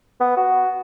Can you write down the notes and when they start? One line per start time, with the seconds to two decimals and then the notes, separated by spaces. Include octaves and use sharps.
0.20 B3
0.37 F#4